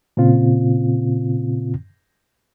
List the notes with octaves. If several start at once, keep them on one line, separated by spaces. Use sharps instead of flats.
A#2 C#3 C4 F4